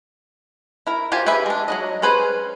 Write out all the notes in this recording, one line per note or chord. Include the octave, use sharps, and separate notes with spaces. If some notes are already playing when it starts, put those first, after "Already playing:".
E4 A#4
F4 G4 C5 G#5
G4 G#4 B4 E5
G#3 D4
F#3 A#3 D#5
C#4 G#4 B4 C5 G#5